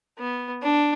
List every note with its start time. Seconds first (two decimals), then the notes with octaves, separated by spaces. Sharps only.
0.18 B3
0.63 D4